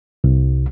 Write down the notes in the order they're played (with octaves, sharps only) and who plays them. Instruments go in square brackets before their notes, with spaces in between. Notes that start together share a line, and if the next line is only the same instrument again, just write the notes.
[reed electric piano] C2